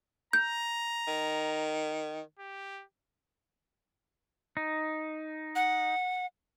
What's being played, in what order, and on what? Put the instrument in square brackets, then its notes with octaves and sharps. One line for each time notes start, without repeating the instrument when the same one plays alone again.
[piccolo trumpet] A#5 [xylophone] G6
[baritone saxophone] D#3
[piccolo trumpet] G4
[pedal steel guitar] D#4
[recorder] F#5